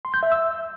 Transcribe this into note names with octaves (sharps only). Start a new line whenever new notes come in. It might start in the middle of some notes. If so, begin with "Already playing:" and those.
C6
G6
E5
E6